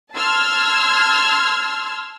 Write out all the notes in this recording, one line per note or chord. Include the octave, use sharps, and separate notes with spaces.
A5 C6 E6 F6 G#6